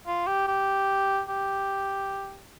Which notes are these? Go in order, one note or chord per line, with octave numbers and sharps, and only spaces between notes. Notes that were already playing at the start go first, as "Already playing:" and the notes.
F4
G4
G4
G4